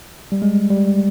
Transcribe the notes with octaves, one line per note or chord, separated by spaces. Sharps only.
G3
G#3
G3